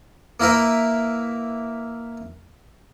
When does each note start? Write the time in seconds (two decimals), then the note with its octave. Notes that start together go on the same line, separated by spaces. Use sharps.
0.40 A#3 E4 A#4 B4